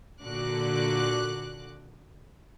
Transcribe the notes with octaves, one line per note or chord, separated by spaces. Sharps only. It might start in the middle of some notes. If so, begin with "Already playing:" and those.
A#2 D3 F#4 D6 F#6